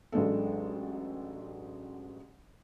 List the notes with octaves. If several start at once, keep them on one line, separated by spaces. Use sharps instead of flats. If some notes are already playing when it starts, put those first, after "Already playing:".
A1 F#3 G#3 D4 A4